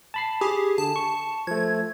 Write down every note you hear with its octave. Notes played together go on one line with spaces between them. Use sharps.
A5 B5 C7
G4 G#4
D3 A5
C#6
F3 A3 G#6